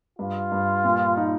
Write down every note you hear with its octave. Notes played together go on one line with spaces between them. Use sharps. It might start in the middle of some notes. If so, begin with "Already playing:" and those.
G2 F4
G2
A#2
D#4